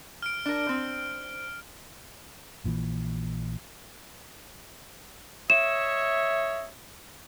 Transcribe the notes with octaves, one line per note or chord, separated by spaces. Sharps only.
F6 D7
D4 A#4
C4
A#1 A#2 D#3 E3
C#5 D#5 E5 E7